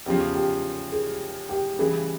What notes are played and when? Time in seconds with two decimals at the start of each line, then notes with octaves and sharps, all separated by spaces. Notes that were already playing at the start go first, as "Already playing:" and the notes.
0.06 E2 C#3 F3 G4
0.35 G4
0.92 G#4
1.49 G4
1.79 C#3 E3 G3 G#4